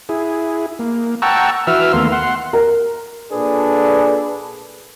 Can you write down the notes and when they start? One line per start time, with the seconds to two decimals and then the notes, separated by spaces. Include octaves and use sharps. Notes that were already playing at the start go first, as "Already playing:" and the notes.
0.09 E4 G#4
0.79 A#3
1.22 F#5 G5 A5 A#5 C#6 E6
1.67 E3 F#4 B4 E5 E6 F6
1.93 D#2 A3 B3 A#4 F5 C6
2.12 F#5 C6
2.53 A#4
3.32 A#2 D4 G#4 A4 B4